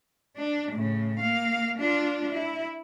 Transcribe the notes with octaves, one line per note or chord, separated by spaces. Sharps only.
D4
A2 C#3
A#3 F5
D4 F4
E4